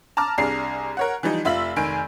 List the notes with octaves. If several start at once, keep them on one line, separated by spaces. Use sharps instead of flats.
A5 A#5 D6 F6
C2 D4 G#4 A#5 C7
A#4 C#5 F#5
E3 F3 G3 D#4
F1 F4 E5 E6 B6 F#7
F1 D#3 G#5 D7